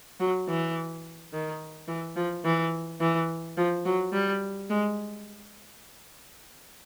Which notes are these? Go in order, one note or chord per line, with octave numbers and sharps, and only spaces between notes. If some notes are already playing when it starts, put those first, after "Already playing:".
F#3
E3
D#3
E3
F3
E3
E3
F3
F#3
G3
G#3